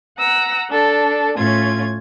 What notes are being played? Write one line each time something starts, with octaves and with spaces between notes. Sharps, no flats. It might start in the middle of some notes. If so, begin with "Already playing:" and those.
F#5 A#5 E6
D4 A4
A2 C#4 F4 G#6